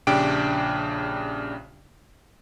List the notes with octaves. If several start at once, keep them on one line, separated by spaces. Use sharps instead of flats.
A#1 C#3 D4 G4 G5 D7